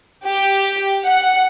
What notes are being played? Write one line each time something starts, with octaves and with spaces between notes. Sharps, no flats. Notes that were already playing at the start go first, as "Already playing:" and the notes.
G4
F#5